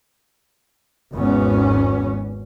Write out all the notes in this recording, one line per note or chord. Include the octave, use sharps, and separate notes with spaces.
G#1 E2 B3 C#4